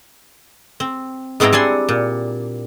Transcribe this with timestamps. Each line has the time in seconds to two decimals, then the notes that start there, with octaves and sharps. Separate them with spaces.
0.80 C4
1.40 G#2 B3 C4 E4 G5 A#5
1.53 G3 D4 F#5 G#5 C6
1.89 A#2